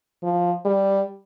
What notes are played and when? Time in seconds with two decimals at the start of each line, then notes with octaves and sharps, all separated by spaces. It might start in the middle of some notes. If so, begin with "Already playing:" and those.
0.23 F3
0.65 G3